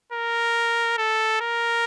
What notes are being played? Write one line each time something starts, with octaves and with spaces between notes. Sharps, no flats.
A#4
A4
A#4